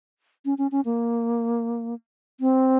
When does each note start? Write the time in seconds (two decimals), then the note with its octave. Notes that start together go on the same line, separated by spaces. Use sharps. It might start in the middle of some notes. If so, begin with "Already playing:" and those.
0.45 C#4
0.58 C#4
0.72 C#4
0.85 A#3
2.40 C4